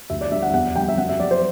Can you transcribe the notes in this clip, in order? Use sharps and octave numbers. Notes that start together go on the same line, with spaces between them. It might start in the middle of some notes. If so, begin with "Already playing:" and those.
D2 E5
D5
D3 G3 E5
F#5
E2 F#5
D3 G3 G5
E5
F#2 F#5
E5
F#3 D5
C5